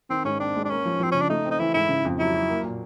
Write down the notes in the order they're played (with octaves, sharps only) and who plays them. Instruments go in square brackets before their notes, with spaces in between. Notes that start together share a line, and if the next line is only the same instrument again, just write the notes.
[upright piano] D#3 [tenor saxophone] C4
[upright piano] G#2 [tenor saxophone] C#4
[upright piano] C4 [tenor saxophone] D4
[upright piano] G#3
[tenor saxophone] D4
[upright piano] A#3 [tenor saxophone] C#4
[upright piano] F3
[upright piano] F3 [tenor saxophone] C4
[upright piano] C#3 [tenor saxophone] C#4
[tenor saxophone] D4
[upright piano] A3 [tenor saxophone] D#4
[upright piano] C4
[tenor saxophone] D#4
[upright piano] E3 [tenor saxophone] E4
[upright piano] G#2 [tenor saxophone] E4
[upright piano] C#3
F2
[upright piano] F#3 [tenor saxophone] E4
[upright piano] F#3
A#3
A#2